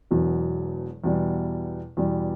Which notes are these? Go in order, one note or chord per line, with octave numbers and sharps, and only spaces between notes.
E1 E2 B2 F#3
E2 B2 G3
E2 B2 G3